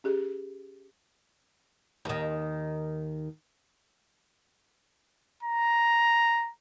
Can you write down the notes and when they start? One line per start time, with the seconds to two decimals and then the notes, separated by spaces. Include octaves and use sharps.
0.04 C#4 G4 G#4
2.05 D#2 D#3
5.43 A#5